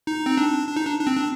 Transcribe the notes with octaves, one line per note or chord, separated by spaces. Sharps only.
D#4
C4
D4
D4
D#4
D4
D4
C4
D4